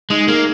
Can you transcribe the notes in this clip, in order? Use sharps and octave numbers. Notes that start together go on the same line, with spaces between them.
G#3 D#4
A#3 G#4